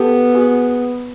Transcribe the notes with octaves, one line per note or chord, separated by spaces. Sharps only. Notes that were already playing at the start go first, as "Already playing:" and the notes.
Already playing: B3 G4 A4
F#4 G#4